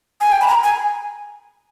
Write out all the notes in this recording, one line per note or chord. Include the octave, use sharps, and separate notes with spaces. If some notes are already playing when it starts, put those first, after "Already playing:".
G#5
G5
B5
A#5
G#5